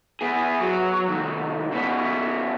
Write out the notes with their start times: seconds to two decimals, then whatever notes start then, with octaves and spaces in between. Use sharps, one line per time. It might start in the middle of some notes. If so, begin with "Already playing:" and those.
0.21 B3 G#4
0.60 F#3
1.08 C2 D#3
1.72 C#3 B3